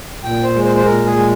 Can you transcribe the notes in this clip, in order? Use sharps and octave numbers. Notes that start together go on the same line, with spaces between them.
A#2 G5
C5
G#3
C5
C5
A#2 A#4
G#4
G#3